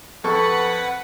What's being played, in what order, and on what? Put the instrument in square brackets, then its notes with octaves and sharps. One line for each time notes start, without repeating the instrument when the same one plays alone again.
[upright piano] F2 A4 C#6 [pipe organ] B4 F#5